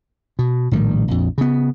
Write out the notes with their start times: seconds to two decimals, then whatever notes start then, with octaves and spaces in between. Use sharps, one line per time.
0.39 B2
0.71 A#1 A2 D#3 G3
1.08 A#1 F2
1.38 C#3 B3